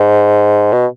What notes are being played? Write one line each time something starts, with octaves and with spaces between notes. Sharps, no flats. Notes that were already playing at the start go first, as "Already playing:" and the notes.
Already playing: G#2
B2